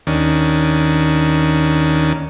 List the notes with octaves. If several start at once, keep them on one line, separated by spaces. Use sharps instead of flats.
D#2 D#3 C#4 D4